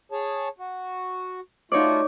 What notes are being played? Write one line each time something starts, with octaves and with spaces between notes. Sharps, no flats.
G#4 C#5 A5
F#4
A3 D#4 F4 F#4 C#5 D5